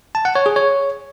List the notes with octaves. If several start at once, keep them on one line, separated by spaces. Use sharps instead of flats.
A5
F#5
C#5
G#4
C#5